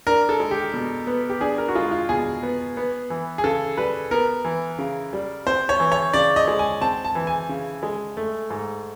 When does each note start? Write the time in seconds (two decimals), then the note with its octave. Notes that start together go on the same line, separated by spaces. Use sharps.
0.07 D4 A#4
0.29 A4
0.40 G#3
0.51 G4
0.74 B2
1.07 B3
1.30 G4
1.41 D4 G#4
1.58 A#4
1.68 F#4
1.75 G#3 F4
1.91 F4
2.09 B2 G#4
2.43 B3
2.77 B3
3.10 E3
3.38 G#4
3.44 C#3 A4
3.77 G3 B4
4.11 B3 A#4
4.45 E3
4.79 C#3
5.13 G3
5.47 C4 C5
5.69 C#5
5.80 E3
5.92 C#5
6.13 C#3 D5
6.36 D#5
6.48 G#3
6.59 G#5
6.81 C4 A5
7.05 A5
7.15 E3
7.27 G#5
7.49 C#3
7.83 G#3
8.17 A3
8.50 G#2